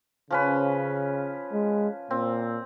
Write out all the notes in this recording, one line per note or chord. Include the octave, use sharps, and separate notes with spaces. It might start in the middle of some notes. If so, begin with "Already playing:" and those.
C#3 F3 C#4 B4
G#3
A#2 C4